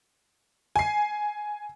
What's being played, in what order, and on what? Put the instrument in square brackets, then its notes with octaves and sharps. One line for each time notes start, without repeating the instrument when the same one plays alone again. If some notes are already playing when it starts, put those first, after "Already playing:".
[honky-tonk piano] G#5 C7